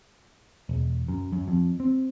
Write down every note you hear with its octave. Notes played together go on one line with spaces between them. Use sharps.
E1
F#2
F#2
F2
C4